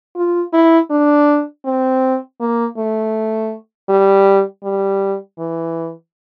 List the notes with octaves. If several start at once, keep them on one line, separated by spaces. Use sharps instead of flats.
F4
E4
D4
C4
A#3
A3
G3
G3
E3